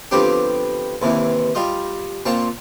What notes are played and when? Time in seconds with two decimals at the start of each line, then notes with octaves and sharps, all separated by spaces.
0.11 D3 F3 B3 C4 D4 G4
1.02 D#2 C3 E3
1.55 G3 F4 D#5
2.26 A#2 C4 F4 A5 C#6